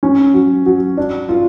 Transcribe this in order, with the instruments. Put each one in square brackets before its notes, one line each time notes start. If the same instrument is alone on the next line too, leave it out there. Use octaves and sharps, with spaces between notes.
[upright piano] C#4
F#3
F#3
D4
F4